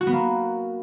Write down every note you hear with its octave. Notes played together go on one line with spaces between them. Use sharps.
F#4
B3
A#3